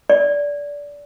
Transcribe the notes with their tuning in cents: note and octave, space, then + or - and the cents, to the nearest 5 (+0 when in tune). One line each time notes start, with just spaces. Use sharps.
D5 -20